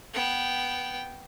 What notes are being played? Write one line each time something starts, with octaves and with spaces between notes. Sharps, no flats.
B3 G5